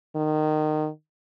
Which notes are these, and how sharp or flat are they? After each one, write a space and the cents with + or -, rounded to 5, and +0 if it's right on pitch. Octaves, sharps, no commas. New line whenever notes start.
D#3 -20